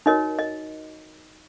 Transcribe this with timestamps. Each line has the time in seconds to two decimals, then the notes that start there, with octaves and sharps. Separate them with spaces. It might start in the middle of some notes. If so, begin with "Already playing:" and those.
0.06 D#4 F#4 A#4 C#5 D#5
0.39 D#5